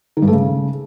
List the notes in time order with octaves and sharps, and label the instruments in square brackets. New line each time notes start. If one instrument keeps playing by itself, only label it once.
[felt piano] D#3
G2
A3
C#3